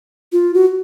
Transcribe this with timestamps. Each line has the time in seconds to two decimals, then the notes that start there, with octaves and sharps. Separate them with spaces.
0.32 F4
0.54 F#4